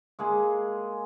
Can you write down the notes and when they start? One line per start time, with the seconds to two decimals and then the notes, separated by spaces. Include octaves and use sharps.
0.19 G#3 A#3 G#4